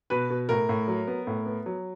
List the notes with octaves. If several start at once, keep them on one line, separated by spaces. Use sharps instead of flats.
B2 B4
B2
A2 A#4
A2
F#3
B3
A2
B3
F#3